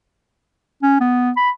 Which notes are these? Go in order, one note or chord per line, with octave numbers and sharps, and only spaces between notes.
C#4
B3
B5